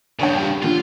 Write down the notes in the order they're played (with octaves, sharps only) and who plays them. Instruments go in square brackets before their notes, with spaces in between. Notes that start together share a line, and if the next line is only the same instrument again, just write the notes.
[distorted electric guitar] G2 C#3 [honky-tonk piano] D4 C#5 G5
[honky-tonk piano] G4
[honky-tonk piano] A#2 D3 [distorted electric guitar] F4